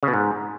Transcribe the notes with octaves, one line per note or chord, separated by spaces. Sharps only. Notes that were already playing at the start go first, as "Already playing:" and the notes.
C#3
B2
G#2